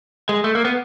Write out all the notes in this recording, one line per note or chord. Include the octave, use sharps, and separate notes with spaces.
G#3
A3
A#3
B3